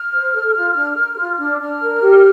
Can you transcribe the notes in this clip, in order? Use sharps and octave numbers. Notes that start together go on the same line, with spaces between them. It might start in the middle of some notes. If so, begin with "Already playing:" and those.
Already playing: F6
C5
A4
F4
D4
A#4
F4
D4
D4 F6
A#4
G4